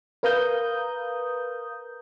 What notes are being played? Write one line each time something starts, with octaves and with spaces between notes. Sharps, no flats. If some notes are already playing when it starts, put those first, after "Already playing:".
A#4 B4 F5 A#5 D#6 G6